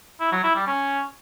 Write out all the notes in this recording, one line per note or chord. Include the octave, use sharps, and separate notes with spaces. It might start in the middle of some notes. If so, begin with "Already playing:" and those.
E4
F#3
E4
G3
C#4